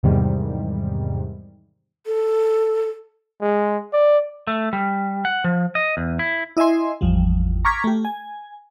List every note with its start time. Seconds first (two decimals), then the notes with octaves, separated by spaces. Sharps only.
0.03 E2 G#2 C3 D#3 G3
2.07 A4
3.41 G#3
3.93 D5
4.47 A3
4.73 G3
5.25 F#5
5.44 F3
5.75 D#5
5.97 E2
6.19 E4
6.57 E4 D#5 E5 G#5 C6
7.01 G#1 E2 F3 G3
7.65 A#5 C#6 D6 F6 G#6 B6
7.84 A3 G4
8.05 G#5